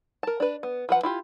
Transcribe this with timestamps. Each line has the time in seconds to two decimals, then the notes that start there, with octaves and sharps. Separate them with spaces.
0.23 A#4 A5
0.40 D4 B4
0.63 B3
0.89 F3 B4 F#5
1.03 E4 F4 G4